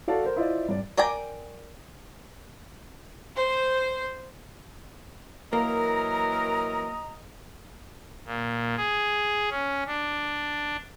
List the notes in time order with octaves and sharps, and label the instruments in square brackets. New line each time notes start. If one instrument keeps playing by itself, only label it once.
[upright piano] F#4 A4 D5 F5 F#5 A5
A#4 C5
E4 F4 C5 D5 D#5
G2 D5
[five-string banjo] A#4 D5 G5 G#5 A#5
[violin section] C5
[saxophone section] E3 F#3 A#4 [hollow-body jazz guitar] A#3 [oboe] D#5 [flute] A#5
[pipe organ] A#2
G#4
C#4
D4